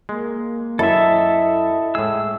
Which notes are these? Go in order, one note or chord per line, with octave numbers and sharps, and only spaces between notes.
G#3 A#3
F#2 E4 A4 D#5 E5
A2 G#3 G#4 E6